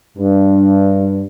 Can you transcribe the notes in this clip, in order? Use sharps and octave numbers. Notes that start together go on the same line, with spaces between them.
G2